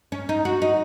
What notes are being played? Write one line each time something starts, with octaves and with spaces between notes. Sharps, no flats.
C#4
D#4
F#4
D#4